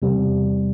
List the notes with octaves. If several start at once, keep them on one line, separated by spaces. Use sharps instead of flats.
E2 C3 G3